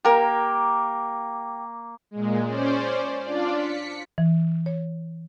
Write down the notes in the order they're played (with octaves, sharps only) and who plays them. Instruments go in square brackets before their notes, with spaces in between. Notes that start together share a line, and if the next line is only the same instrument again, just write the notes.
[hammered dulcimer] A#3 [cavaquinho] G4 A#4
[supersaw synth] A#2 G#3
C#4 C5 D5
D4 F4 D5
B6 C#7
[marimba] E3
C#5